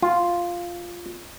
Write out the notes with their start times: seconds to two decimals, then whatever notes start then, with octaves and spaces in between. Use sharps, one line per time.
0.02 F4